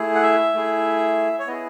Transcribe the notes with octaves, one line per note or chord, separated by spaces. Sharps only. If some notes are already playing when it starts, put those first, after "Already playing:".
Already playing: A3 E4 G#4
F#5
E5
A3 E4 G#4
C#5
B3 E4 G#4 D#5